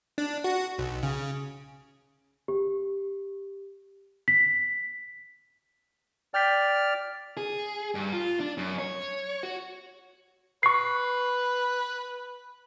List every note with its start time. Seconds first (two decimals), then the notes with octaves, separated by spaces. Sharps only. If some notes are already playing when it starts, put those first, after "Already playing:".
0.18 D4
0.44 F#4
0.78 B1
1.03 C#3
2.48 G4
4.28 B6
6.34 D5 G5 F6 G6 B6
7.37 G#4
7.95 G2
8.13 F4
8.40 D4
8.57 F#2
8.79 C#5
9.43 F#4
10.63 B4 C#6 C7